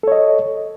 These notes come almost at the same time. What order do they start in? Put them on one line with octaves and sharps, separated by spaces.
A4 C#5 D#5